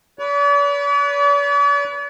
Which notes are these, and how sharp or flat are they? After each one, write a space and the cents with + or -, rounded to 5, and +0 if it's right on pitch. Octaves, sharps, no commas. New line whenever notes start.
B4 +0 D5 -45